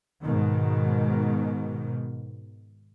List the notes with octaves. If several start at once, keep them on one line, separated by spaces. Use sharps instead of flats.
G#2 B2 D#3